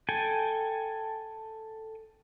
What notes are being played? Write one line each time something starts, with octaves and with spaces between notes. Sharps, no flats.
A4 G5 G#5